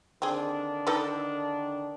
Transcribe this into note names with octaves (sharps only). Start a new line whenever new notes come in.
D3 D#3 C4 D4 G#4
D#4 A4 B4